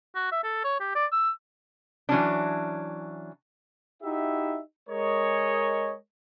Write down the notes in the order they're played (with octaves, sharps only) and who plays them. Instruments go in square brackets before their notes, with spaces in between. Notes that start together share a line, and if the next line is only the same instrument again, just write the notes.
[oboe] F#4
E5
A4
C#5
G4
D5
E6
[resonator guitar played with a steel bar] E3 F#3 C#4 D4
[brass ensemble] D#4 E4 F#4 G4 E5
G#3 A#4 C#5 D#5